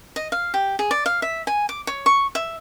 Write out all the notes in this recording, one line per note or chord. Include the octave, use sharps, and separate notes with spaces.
D#5
F5
G4
G#4
D5
F5
E5
G#5
D6
C#5
C#6
E5